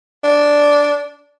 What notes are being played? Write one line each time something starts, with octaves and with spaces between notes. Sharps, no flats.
D4